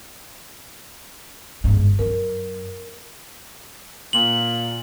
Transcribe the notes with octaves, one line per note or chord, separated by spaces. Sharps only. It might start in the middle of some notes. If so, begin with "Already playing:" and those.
G1 G#2
F#2 A#4
A#2 F#7